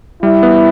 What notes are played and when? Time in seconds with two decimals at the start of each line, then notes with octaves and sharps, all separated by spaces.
0.22 G3 E4
0.43 B3